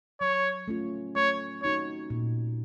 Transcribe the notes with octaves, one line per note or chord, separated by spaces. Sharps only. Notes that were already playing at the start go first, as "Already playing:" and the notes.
F#3 C#5
A3 C#4 F4
A3 C#5
C4 D#4 F#4 C#5
A#2